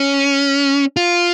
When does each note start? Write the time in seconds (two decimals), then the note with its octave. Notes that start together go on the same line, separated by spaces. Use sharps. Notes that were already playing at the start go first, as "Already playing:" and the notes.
Already playing: C#4
0.97 F4